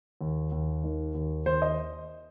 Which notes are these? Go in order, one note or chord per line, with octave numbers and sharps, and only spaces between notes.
D#2
D#2
D#3
D#2
D#2 C5
D#5